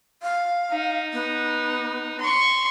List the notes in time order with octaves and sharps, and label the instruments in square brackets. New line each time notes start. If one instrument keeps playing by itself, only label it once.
[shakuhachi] F5
[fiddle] D#4
[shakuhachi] B3
[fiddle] C6 C#6